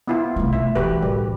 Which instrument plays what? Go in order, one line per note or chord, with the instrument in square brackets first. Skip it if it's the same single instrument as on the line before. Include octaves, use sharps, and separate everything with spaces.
[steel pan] B3 E4 F4
[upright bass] C2 A3
[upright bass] C3 [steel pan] E5
[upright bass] D3 E3 [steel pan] F#4 G4 B4
[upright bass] A2 [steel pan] G3